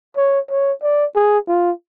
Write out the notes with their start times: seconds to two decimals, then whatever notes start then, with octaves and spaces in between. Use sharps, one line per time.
0.17 C#5
0.50 C#5
0.82 D5
1.15 G#4
1.48 F4